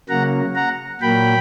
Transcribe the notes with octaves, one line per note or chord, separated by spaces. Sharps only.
C#3 F#3 A#3 F#5 A#5
F#5 A#5
A#2 F#3 A#3 G5 B5